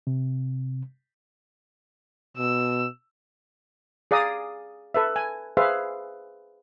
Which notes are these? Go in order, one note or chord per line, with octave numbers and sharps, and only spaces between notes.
C3
B2 E6
G#4 D5 F5 A#5 D#6
A4 B4 E5
G#5
G#4 B4 C5 E5 F5